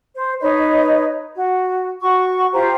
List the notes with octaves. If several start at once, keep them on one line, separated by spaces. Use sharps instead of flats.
C5
D#4 B4 C#5 D#5
F#4
F#4 C#6
F4 G4 C5 A#5